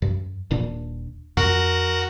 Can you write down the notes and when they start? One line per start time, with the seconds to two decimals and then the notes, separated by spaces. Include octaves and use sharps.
0.02 F#2
0.51 D#1 A#2 D4
1.37 F2 F#4 A#4 F#5